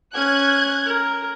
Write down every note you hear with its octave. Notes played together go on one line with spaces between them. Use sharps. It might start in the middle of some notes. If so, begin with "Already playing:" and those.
C#4 F#6 G#6
A#4